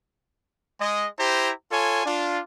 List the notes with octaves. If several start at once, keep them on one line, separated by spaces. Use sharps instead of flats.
G#3 D#5
E4 G4 C5 A#5
F4 A4 C#5 G#5
D4 F4